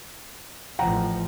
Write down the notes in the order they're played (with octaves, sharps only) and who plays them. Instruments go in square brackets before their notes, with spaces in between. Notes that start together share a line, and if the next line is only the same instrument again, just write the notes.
[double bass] A1 F3 [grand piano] F#5 G5 A#5